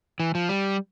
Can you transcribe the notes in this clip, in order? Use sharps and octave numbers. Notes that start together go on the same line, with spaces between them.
E3
F3
G3